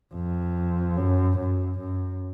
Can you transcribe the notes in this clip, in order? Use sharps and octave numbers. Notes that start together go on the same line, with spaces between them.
F2
F#2
F#2
F#2